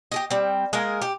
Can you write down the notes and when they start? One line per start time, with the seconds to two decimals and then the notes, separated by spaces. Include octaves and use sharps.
0.12 G4 G#4 D#5
0.31 G3 C4
0.73 G#3 A#3 G#4 A#4
1.02 G4